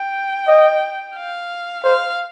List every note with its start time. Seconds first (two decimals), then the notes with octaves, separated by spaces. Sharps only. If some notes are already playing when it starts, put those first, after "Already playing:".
Already playing: G5
0.48 D#5
1.16 F5
1.84 C5 F5